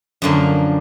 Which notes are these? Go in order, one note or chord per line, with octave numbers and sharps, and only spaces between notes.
F#2 D3 F3 A#3